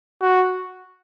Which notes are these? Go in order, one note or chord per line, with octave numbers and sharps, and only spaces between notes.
F#4